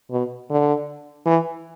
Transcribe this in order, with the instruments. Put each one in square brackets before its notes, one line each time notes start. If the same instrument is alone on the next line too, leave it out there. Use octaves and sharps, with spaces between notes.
[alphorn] B2
D3
E3